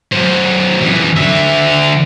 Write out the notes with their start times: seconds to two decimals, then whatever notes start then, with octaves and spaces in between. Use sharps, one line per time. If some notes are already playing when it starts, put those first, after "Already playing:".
0.13 F#2 C5
0.80 F#2 E3
1.16 D3 E5